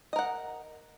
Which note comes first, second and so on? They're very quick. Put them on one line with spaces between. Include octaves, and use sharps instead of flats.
D#5 A#4 F#5